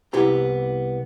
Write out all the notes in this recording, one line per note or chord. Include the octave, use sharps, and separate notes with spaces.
C2 B3 E4 G4 A#5